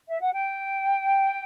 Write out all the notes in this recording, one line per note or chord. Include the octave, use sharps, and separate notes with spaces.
E5
F#5
G5